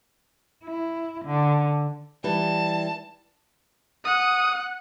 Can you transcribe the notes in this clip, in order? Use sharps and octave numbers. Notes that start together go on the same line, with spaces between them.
E4
D3
E3 G3 A5
F#5 D#6